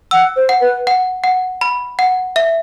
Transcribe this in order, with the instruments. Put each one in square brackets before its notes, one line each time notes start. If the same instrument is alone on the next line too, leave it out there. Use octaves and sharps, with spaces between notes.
[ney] F#5 [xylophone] E6
[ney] C5
[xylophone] F#5
[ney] B4
[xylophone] F#5
F#5
B5
F#5
E5